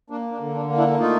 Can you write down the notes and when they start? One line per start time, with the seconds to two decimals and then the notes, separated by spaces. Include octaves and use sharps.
0.10 A#3 D4
0.32 D4
0.40 D3
0.55 D4
0.69 A#3
0.78 D4 E4
1.00 A3 D#4 F4